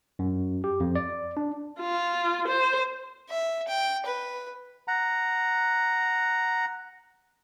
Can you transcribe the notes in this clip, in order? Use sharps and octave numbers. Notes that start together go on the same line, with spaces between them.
F#2
G4
F2
D5
D4
F4
C5
E5
G5
B4
F#5 A#5